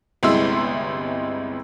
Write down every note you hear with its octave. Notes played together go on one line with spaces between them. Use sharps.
G1 C2 G#3 E4 C6 E6